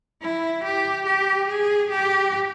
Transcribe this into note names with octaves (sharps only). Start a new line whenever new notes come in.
E4
G4
G4
G#4
G4